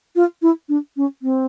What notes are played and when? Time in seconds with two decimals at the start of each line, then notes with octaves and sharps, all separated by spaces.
0.16 F4
0.42 E4
0.69 D4
0.97 C#4
1.22 C4